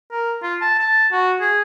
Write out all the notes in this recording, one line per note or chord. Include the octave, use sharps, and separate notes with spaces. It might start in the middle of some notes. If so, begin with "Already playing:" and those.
A#4
F4
A5
A5
F#4
G#4